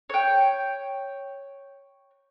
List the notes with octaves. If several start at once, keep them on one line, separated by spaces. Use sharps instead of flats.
C#5 G5